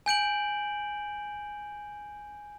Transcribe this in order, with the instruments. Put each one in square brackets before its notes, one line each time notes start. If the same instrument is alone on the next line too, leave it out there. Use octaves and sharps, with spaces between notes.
[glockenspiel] G#5 G6 D7 F#7